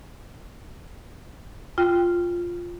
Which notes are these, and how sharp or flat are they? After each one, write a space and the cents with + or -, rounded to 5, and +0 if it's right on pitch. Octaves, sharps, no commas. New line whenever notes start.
F4 +0 G5 +0